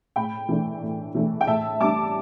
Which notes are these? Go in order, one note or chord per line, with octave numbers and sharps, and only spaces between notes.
A2 G5 B5
E3 A3 D4
A2
E3 A3 D4
G5
A2 E5 A5
G3 D4 A5 D6